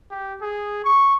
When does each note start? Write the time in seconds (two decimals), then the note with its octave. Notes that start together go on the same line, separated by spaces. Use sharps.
0.11 G4
0.42 G#4
0.84 C#6